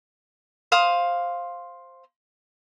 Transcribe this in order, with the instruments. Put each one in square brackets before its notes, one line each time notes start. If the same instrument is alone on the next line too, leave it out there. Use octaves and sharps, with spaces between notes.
[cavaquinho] C5 F5 D#6